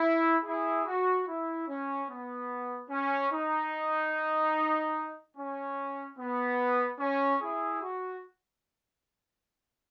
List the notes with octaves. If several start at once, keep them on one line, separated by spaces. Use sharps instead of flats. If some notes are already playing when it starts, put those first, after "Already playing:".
Already playing: E4
E4 G#4
F#4
E4
C#4
B3
C#4
D#4
C#4
B3
C#4
E4 G#4
F#4